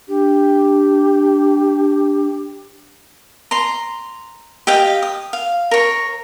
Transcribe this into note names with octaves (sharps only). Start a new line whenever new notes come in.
D4 G4
A#5 C6
G4 D#5 F5 G5
D#6
F5
A#4 C#5